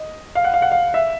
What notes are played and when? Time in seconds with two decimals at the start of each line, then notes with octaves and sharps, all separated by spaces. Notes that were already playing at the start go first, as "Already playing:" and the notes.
Already playing: D#5
0.35 F5
0.44 F#5
0.54 F5
0.62 F#5
0.72 F5
0.94 E5